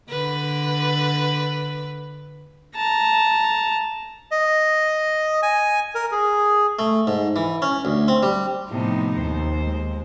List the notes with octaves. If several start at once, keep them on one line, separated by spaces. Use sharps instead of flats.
D3 B4
A5 A#5
D#5
G#5
A#4
G#4
A3
G#2
E3
C#4
D2
C4
G3
A2 C3 F3 B3 D#4
D#2 C5
G#3